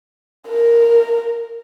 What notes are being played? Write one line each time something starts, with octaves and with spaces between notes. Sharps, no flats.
A#4